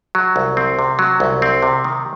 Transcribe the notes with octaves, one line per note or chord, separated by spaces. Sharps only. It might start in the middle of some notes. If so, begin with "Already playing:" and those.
F#3
C2
C4
C3
F#3
C2
C4
C3
D#3